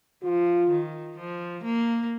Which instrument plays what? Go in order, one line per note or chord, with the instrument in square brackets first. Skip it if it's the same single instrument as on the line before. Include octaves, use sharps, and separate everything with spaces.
[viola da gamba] F3 [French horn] F4
[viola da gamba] D#3
F3
A#3